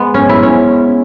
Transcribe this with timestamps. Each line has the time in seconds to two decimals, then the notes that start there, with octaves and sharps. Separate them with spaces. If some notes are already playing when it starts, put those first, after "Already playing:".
Already playing: G#3 B3
0.14 C#4
0.29 E4
0.43 C#4